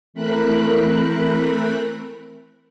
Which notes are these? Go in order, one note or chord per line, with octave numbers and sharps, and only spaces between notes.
E3 A3 C4 A#4 B5 F#6